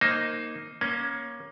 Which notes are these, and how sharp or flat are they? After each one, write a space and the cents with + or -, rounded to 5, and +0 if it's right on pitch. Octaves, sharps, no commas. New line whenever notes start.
A#3 +0 D#4 +0 C5 +15
A#3 +20 C#4 +0